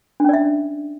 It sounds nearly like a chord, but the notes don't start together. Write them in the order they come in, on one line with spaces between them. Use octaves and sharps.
D4 C#4 D5 E5